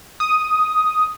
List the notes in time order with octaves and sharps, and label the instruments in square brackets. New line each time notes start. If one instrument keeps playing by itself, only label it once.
[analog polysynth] D#6